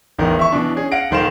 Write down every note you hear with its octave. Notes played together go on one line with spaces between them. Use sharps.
E1 A1 D#3 A#4
E5 C#6
B2 E3 D4
C#4 G#4
F5 F#5 A#6 D7
D#1 D#3 C5 F5 E7